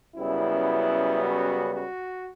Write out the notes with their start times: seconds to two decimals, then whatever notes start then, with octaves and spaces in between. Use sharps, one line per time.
0.17 F#2 C#3 G3 B3 E4
1.21 F#4
1.74 F#4